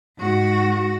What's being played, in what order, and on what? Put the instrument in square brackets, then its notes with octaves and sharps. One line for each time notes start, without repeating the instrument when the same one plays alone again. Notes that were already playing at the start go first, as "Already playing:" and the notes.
[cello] G#2 F#4